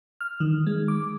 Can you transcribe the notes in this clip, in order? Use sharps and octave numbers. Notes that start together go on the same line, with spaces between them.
F6
D#3
G#3
D6